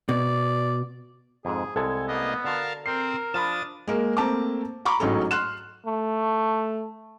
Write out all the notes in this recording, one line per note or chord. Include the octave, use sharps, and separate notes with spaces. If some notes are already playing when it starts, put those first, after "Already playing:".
B2 D5
F2 G#2 G#4
C2 G#3 A4 G#5 G#6
A#3 B3 D#5
D3 F#4 A#4 F5 A5
C4 A#4 C5 C7
F3 D4 B5 D#6 F6 A6 E7
G#3 A#3 A#4
A3 A#3 C4 A5 A#5 D6
A#5 B5 C#6 D6
A1 G#2 F#3 C#4 A4
C6 F6 F#6 E7
A3